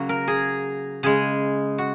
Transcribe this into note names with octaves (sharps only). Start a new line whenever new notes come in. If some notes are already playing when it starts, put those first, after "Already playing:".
Already playing: C#3 F#3 A#3 F#4
A#4
G#4
C#3 G#3 G#4
F#4